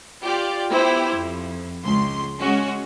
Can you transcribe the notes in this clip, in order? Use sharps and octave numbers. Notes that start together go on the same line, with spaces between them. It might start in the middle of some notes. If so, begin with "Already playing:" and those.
F4 G4 D5
B3 E4 G4 C5
F2
C#2 C6
G#3 C#4 F#4